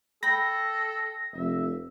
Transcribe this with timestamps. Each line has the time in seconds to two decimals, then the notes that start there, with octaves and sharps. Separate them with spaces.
0.23 A4 G5 B5 A#6
1.34 F1 E5